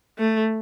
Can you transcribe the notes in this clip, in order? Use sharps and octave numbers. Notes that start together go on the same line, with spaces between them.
A3